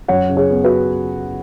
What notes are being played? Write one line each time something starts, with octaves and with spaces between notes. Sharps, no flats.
F#2 C#5 F#5
C#3
G#4 C#5
B3
F#4 B4